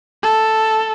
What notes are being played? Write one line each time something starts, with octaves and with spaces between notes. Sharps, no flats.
A4